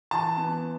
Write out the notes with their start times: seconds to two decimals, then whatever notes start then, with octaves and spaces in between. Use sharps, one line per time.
0.11 E3 A5
0.37 B3